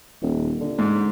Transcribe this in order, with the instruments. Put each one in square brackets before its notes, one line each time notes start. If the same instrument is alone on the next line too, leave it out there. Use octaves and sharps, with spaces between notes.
[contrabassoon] D#1
D3
[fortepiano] G#2